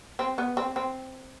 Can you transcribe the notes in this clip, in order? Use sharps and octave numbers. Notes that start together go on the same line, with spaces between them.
C4
B3
C4
C4